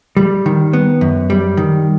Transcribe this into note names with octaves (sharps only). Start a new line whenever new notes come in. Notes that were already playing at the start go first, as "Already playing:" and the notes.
G3
D#3
B3
F#2
G3
D#3